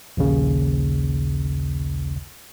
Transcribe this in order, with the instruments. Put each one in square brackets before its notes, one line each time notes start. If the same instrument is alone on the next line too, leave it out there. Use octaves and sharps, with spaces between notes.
[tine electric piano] A#1 D#2 C#3